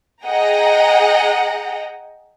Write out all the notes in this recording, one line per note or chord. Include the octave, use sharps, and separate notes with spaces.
G#4 D#5 F#5 G5 A#5